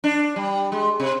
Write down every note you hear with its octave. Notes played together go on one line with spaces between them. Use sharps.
D4
G3
G#3
C3